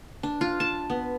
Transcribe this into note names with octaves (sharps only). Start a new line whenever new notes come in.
D4
F4
A5
B3